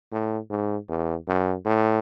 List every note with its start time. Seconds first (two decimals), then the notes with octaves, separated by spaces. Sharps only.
0.12 A2
0.50 G#2
0.88 E2
1.28 F#2
1.66 A2